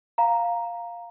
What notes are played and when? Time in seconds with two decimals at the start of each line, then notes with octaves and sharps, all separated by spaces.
0.18 F5 A#5